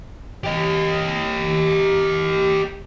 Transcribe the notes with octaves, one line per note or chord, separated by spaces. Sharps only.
G4 D#5